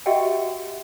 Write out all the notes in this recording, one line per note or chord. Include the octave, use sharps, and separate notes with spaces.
F#4 G4 D#5 E5 F#5 G5